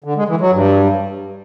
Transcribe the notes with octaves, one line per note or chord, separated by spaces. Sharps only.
D3
G#3
E3
F#3
G2